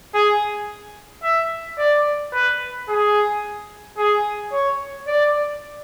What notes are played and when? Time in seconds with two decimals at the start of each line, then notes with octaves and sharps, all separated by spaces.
0.14 G#4
1.23 E5
1.78 D5
2.33 B4
2.89 G#4
3.98 G#4
4.52 C#5
5.07 D5